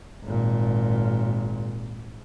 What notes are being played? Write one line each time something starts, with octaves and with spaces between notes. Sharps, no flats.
G#1 A#2